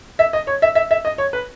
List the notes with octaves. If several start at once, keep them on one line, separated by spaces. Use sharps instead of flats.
E5
D#5
C#5
E5
E5
E5
D#5
C#5
B4